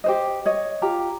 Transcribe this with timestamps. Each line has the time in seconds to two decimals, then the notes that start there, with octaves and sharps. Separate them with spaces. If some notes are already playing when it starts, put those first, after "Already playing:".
0.04 G4 C5 D#5
0.46 C#5 D#5
0.82 F4 G4 A#5